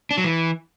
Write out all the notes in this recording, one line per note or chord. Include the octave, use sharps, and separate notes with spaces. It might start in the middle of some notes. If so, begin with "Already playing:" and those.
D4
F#3
E3